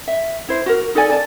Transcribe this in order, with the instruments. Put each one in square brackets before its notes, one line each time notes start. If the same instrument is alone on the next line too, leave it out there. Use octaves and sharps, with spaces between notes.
[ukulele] E5
E4 C5
F#4 A#4
D#4 A4 D5 G#5
D5 A5